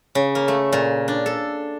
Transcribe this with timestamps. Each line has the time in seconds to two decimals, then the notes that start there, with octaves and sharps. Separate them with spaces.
0.15 C#3
0.35 A#3
0.48 A3
0.73 A#2
1.08 D4
1.26 A4